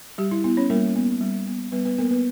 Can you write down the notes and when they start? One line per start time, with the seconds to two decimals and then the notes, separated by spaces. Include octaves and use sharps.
0.18 G3 G4
0.31 E4
0.44 B3 E4
0.57 C#4 C#5
0.70 G3 A#3 A#4
0.96 B3
1.21 G3
1.47 B3
1.72 G3 B3 B4
1.85 B3 B4
1.98 A#3 B3 A#4
2.11 B3 B4